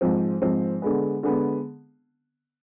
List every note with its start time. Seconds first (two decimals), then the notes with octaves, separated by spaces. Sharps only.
0.01 G#2 F3 C4
0.42 G#2 F3 C4
0.82 D3 G#3 B3
1.23 D3 G#3 B3